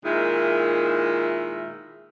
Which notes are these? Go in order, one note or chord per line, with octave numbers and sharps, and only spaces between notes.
A#2 D#3 G#3 E4 A#4 E5